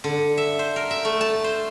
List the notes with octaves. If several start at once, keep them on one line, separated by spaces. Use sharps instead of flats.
D3
E5
C5
A#4
E5
A3
A5
C5